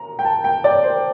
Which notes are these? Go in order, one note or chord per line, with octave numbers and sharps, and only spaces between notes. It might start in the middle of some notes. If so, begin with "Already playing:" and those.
Already playing: A#5
G5
A5
G5
D5
C5